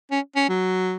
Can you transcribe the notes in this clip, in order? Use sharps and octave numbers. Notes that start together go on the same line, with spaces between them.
C#4
C#4
F#3